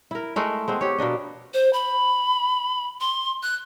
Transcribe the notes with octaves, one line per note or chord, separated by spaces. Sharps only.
E4 A#4
G#3 A3 A#4
G#3 B3 C4
G4 C#5
B2 A#3 D4 D#5
C5
B5
C6
F#6